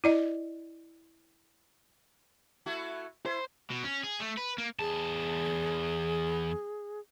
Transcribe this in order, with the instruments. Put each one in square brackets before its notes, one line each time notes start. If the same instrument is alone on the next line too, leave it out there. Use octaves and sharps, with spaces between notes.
[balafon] E4 D5 D#5
[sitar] A3 E4 F#4
[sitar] E4 [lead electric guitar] C5
[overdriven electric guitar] B2
C#4
G#4
A3
B4
A#3
[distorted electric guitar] E2 A5 [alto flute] G#4